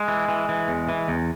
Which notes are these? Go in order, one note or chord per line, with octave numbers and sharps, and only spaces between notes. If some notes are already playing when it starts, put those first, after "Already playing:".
Already playing: G#3
E3
E3
E3
E2
E3
E2